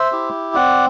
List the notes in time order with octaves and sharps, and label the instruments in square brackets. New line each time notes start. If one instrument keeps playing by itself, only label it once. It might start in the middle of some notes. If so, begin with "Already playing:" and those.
Already playing: [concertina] C5 E5
E4 G4
C4 D5 F#5